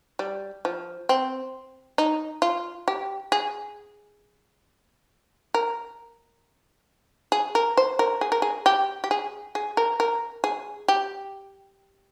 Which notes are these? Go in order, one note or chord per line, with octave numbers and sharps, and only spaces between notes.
G3
F3
C4
D#4
F4
G4
G#4
A#4
G#4
A#4
C5
A#4
G#4
A#4
G#4
G4
G4
G#4
G#4
A#4
A#4
G#4
G4